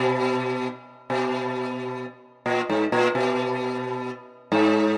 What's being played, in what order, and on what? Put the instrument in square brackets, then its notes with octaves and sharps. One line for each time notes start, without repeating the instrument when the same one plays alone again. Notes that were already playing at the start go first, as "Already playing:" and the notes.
Already playing: [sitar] B2
B2
A#2
G#2
A#2
B2
G#2